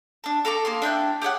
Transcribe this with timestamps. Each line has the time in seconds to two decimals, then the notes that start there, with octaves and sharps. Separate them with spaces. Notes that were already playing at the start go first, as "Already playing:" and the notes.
0.24 D4 A5
0.45 A4 A#5 C#6 D6
0.65 A#3 G#4 C6
0.82 D4 E4 G5 F#6
1.22 G4 G#4 C#5 F#5